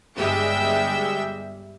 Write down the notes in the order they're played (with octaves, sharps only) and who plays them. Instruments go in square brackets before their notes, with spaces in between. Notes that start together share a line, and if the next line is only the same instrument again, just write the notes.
[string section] G1 G3 G#3 E5 G5 E6